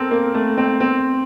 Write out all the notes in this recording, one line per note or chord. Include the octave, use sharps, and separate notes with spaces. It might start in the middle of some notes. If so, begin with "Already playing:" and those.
Already playing: C4 A4 A#4
A#3
A3
C4
C4